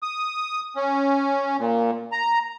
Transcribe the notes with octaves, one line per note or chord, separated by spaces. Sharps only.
D#6
C#4
A#2
A#5